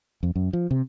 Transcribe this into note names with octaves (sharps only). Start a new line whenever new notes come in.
F2
F#2
F3
C3